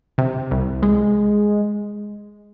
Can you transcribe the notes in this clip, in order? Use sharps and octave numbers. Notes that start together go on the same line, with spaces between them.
C3
C2
G#3